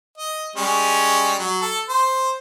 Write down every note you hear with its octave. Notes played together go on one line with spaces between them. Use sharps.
D#5
G3 G#3 C#4
F#3
A4
C5